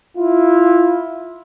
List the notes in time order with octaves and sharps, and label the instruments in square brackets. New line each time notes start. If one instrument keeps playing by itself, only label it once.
[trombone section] E4 F4